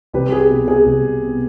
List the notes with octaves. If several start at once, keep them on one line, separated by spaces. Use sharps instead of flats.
C2 G4 B4
G#4
B2 B3
G#4
C2
B2 B3